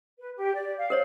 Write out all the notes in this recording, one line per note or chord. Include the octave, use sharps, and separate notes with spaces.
B4
G4
D5
F5
A#4 C5 C#5